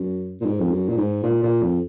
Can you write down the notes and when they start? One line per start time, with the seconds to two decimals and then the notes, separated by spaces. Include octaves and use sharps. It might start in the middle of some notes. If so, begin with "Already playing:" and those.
Already playing: F#2
0.41 A#2
0.45 G#2
0.60 F2
0.71 F#2
0.89 A#2
0.97 G#2
1.23 A#2
1.43 A#2
1.62 F2